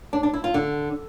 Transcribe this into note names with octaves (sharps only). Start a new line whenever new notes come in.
D4
D4
E4
F4
D3